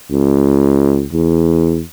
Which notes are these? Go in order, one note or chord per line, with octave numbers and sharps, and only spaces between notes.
C#2
E2